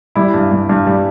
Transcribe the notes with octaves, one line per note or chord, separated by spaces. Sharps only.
G3 E4
G2
G2
G2
G3